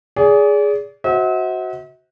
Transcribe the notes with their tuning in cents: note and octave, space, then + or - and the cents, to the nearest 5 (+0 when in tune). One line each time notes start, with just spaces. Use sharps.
G#4 +0 D5 -35
F#4 +0 C5 +0 E5 -45